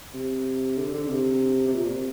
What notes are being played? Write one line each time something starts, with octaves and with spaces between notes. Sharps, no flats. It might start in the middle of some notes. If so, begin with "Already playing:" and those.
C3
D3
D3
C3
C3
A#2
C3